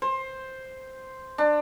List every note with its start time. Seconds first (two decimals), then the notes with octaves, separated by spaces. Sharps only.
0.02 C5
1.38 D4